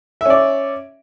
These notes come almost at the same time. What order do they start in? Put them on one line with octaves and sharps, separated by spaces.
E5 C#4 D5